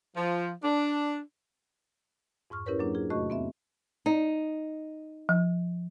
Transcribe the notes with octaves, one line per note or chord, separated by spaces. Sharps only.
F3
D4
F2 G#2 C#6 F6
C#4 E4 G4 A#4 B4 C#5
F#3 A#3 D4 G#4
F4 G#4
E2 C3 A3 F#4 D#5 C#6
B3 C4 E5
D#4
F3